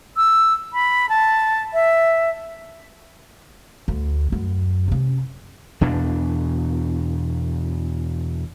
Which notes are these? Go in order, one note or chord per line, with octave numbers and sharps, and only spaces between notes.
E6
B5
A5
E5
D2
F#2
C3 C#4
E2 B2 D4